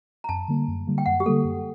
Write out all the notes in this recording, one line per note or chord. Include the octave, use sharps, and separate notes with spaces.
A#5
F#2 A5
D3 G3 A#3
F#2
D3 G3 A#3
G5
F#2 F#5
G4
D3 G3 A#3 A4
F#2